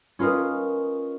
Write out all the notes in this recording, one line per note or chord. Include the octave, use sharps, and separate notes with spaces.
C#4 F4 A#4 B4 D#5